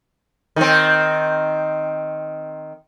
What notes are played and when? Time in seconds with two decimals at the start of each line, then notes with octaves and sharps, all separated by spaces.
0.56 D#3 C4